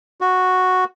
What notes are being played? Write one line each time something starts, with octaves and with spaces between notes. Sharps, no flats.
F#4